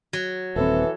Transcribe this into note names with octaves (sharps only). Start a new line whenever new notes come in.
F#3
D#1 E3 C4 A4